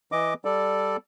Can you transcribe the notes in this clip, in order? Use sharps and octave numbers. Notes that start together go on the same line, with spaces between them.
E3 D#5 D6
G3 A4 D5